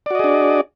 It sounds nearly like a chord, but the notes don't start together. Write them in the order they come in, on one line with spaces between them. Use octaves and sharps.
D5 F#4 D#5 G#4 D4